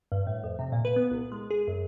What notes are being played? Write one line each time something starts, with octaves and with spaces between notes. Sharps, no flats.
G2
A2
F2
C3
A#2
B4
B3
C2
G#3
G#4
F#2